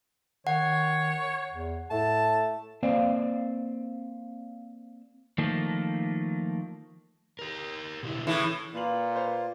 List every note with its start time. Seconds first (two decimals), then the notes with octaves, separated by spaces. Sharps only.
0.47 D#3 C#5 F#5
1.52 E2
1.91 A2 A3 A5
2.83 A#3 C4 C5 D5 F5 G5
5.38 D#3 F3 A3 A#3
7.39 G4 A#4
8.03 B2 D3 E4
8.27 A2 E3 C#4 G#4
8.75 A#2 A#3 F4 B4 F5 F#7
9.15 B4 C5 F5